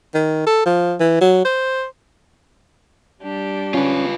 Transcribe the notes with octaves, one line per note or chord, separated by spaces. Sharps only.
D#3
A4
F3
E3
F#3
C5
G3 D4 G4
C#4 F4 B4